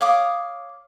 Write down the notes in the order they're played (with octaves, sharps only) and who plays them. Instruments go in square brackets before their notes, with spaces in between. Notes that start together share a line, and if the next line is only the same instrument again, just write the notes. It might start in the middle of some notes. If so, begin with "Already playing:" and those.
[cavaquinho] C#5 F5 D6 D#6